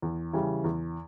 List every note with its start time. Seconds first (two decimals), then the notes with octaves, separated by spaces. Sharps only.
0.02 E2
0.33 C#3 E3 G3
0.64 E2